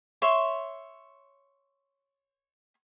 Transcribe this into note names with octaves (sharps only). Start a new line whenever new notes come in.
C#5 E5 C6